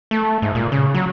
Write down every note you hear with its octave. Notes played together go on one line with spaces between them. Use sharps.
A3
G#2
A#2
C#3
F#3